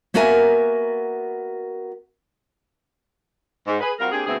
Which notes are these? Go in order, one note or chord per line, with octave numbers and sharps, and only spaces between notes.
A#3 B3 F#4 A#4 E5 G#5
G#2
G#4 B4
G3 C4 F4 F#4 A#4
A#3 C4 D4 G4 G#4
D2 B2 B3 C4 G#4 E5